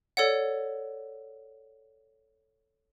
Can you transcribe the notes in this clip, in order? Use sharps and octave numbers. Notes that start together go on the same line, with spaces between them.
A4 C#5 D5 F#5